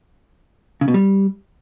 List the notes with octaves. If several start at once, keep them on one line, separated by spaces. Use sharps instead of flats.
C#3
B2
G3